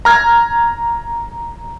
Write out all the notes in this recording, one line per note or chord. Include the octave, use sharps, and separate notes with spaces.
A#5 F6 G#6